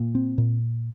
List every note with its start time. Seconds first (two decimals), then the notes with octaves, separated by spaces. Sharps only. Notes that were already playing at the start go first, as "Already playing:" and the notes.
Already playing: A#2
0.15 C4
0.38 A#2